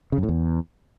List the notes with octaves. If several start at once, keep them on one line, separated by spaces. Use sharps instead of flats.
C#3
F#2
A2
E2